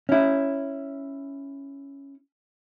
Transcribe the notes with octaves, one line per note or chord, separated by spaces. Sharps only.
C#4 E4